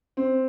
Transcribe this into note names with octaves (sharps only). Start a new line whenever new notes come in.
C4